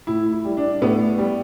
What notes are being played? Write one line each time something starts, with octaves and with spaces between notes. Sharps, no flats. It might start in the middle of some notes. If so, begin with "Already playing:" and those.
A2 E4
E4
G3
D4
A2 B3
G3